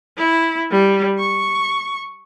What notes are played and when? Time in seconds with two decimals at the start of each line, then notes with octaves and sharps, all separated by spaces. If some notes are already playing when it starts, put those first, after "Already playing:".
0.18 E4
0.71 G3
1.18 C#6